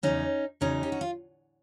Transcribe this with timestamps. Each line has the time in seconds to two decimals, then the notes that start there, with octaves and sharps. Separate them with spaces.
0.03 E2 C#3 F#3 C#4 D#4
0.61 E2 C#3 F#3 C#4 D#4
0.83 G4
0.92 F#4
1.01 F4